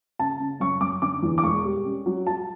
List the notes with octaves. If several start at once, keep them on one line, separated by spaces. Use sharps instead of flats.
C#3 A5
C#3
F#2 C#6
F#2 D6
D3 D6
E2
D6
E1 C#6
G3
C#4
F#3
F#3 A5